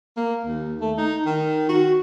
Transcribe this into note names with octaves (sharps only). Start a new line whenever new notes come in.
A#3
D#2
A3
D#4
D#3
F#4